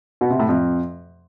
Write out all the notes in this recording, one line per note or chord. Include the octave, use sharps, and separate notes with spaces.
B2
C3
A2
F2